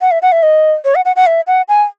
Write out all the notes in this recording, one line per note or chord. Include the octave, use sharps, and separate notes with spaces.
F#5
E5
F#5
E5
D#5
C#5
F#5
F#5
F#5
E5
F#5
G#5